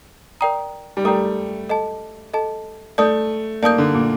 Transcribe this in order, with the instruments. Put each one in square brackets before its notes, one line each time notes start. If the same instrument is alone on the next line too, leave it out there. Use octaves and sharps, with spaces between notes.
[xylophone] A#4 D5 G5 A#5 D#6
[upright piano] G3
[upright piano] A3 [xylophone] A#4 D5 G5 A#5 D#6
[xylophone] A4 D#5 A5
A4 D#5 A5
[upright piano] A3 [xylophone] D5 A5 D#6 G6
[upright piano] A#3 [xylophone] D5 A5 D#6 G6
[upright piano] D3
A#2